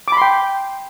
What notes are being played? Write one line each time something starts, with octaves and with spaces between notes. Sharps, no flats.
G5 B5 C6 D6